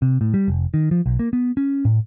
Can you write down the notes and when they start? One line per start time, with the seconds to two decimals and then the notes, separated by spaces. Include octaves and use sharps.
0.02 C3
0.21 A2
0.34 G3
0.48 F1
0.74 D#3
0.91 F3
1.06 B1
1.19 A#3
1.33 B3
1.57 C#4
1.85 A2